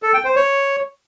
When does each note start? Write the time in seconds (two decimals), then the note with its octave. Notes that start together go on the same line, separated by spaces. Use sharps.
0.03 A4
0.14 G5
0.25 C5
0.36 C#5